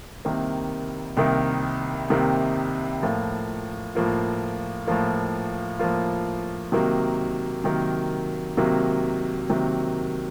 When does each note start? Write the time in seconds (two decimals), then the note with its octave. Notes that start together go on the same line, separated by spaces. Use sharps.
0.25 C2 C3 D#3 A#3
1.17 C2 C3 D#3 A#3
2.10 C2 C3 D#3 A#3
3.02 A2 F3 A#3 F4
3.95 A2 F3 A#3 F4
4.87 A2 F3 A#3 F4
5.79 A2 F3 A#3 F4
6.72 C3 D#3 F#3 A#3
7.64 C3 D#3 F#3 A#3
8.57 C3 D#3 F#3 A#3
9.49 C3 D#3 F#3 A#3